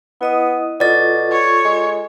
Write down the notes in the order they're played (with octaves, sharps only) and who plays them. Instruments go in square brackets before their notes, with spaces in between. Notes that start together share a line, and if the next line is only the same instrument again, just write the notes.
[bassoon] B3 [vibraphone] E4 D#5 D#6
[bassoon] B2 [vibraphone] F4 A4 [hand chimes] D5 A6
[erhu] C#5
[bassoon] G#3